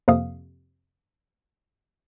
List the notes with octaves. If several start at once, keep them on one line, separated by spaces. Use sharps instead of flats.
F2 C3 A#3 F5 D#6